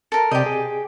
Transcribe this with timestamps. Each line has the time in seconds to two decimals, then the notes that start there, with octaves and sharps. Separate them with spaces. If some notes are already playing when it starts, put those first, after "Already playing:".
0.12 A4 A#4
0.31 C3 G4 D5 D#5 G6
0.46 G#4